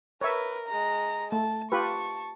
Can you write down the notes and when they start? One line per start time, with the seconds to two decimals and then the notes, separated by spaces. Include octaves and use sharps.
0.21 A#4 B4 C#5 E5
0.69 G#3 A#5
1.32 A3 A5
1.72 F4 G4 B4 A5 C#6